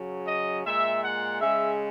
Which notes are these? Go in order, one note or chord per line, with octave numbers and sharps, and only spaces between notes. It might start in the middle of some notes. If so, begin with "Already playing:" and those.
Already playing: C#3 F#3
D#5
A#2 G#3 E5
F#5
C#3 G#3 E5